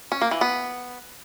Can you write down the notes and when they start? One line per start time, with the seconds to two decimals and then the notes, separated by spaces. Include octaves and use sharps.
0.12 C#4
0.22 A#3
0.31 E3
0.41 B3